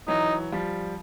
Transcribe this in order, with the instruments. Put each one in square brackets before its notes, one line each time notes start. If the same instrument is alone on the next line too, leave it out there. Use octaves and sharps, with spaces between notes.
[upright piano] E3 F#3 [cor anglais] D#4
[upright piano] F3 G3